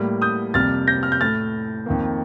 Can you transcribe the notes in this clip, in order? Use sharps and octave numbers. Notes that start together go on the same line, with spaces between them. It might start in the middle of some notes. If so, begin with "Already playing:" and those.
Already playing: A2 G3 A#3
D#6 G6
F2 C3 G3 A#3 F6 A6
G6 A#6
F6
G6
A2 A3 F6 A6
F2 D#3 A#3